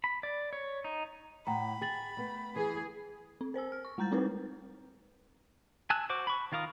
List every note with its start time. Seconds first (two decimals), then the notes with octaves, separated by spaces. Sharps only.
0.04 B5
0.23 D5
0.53 C#5
0.84 D#4
1.47 A2 F#5 G5 A#5 B5
1.81 G#4 G5 A6 F#7
2.17 A3 B3
2.56 E3 G#4
3.41 C4
3.54 A#4 C5 G#5 E6
3.72 F6
3.85 C#6
3.98 G3 G#3 A#5 G6 A6
4.11 A3 C4 D#4 E4 A#4 B4
5.90 G#5 A5 E6 F#6
6.10 F#4 C5 D6
6.27 B5 C#6
6.52 D#3 F4 A#4 F5 D#6